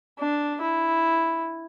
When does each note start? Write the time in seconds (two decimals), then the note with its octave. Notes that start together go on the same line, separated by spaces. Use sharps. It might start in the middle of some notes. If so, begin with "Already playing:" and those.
0.19 D4
0.62 E4